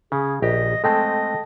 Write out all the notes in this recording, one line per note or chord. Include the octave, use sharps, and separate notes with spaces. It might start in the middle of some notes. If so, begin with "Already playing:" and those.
C#3 G#4
A#1 G4 D#5
G#3 A3 C4 A4 D#5 G5 A5